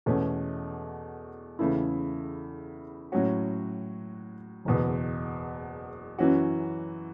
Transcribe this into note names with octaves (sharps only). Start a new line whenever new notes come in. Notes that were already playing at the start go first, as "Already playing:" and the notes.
E2 B2 A3 C#4
E2 C#3 A3 E4
A2 F#3 C#4 F#4
F#1 E2 B2
F#2 E3 C#4 F#4